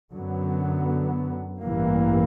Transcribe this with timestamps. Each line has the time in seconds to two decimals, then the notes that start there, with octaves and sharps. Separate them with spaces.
0.13 F#2 D3 F#3 B3
1.60 A1 G2 E3 G3 A#3